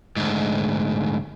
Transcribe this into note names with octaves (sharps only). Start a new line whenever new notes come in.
D2 G#2